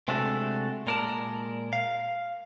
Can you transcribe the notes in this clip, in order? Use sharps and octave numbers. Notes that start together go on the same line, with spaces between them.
C3 G#3 A3 D4 F#4 A4
A#2 G#3 A#4 D5 A5
F5